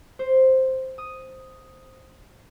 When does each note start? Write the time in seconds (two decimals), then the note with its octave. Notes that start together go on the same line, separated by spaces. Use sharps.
0.19 C5
0.98 D#6